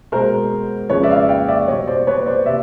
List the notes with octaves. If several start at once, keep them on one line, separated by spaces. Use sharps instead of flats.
B2 G#3 A#4 C5
F2 C#3 F3 G#3 B4 C#5
D5 E5
F5
D5 E5
F5 G5
D5 E5
B2 G3 C#5 D#5
C5 D5
B4 C#5
C5 D5
C3 D5 E5